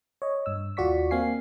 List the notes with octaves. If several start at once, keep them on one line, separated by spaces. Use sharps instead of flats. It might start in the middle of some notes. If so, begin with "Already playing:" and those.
C#5 D#5
G2 E6
D#2 F4 F#4 D5 C#6 B6
A#3 C4 F5 G#5 C7